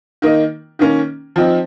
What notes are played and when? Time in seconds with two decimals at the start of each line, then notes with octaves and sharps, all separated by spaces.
0.22 D#3 A#3 D#4
0.79 D#3 A#3 C#4
1.36 F3 C4 D#4